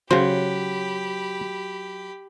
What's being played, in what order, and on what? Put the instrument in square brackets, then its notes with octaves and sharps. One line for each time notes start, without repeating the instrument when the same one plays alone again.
[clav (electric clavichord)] C#3 C5 [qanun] F#3 [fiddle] G4 B5